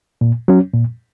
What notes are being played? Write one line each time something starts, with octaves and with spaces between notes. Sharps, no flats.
A#2
F#3 C#4
A#2